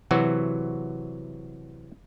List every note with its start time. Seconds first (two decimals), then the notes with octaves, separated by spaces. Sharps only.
0.11 C3 E3 F#3 F#4